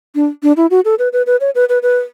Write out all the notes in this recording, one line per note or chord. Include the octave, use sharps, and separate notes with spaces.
D4
D4
E4
F#4
A4
B4
B4
B4
C#5
B4
B4
B4